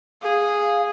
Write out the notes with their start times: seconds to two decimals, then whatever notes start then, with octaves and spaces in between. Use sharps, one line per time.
0.23 G#4 F5